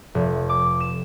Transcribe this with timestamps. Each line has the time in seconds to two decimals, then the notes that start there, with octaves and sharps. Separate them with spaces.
0.15 F1
0.49 D6
0.80 E7